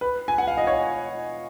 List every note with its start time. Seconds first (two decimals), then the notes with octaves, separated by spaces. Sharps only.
0.01 B4
0.28 G#5
0.38 F#5
0.47 F5
0.58 D#5
0.67 C#5